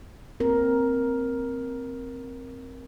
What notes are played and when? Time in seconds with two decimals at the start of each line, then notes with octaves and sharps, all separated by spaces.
0.40 C4 A#4